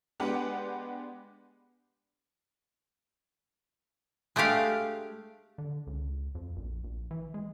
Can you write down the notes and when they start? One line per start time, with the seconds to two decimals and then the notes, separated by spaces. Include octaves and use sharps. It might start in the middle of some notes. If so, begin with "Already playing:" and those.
0.20 G#3 B3 D4 G4 B4 F#5
4.36 G#3 A3 D4 G4 F5
5.58 D3
5.87 C#2
6.35 F2
6.56 A#1
6.84 A#1
7.11 E3
7.34 G#3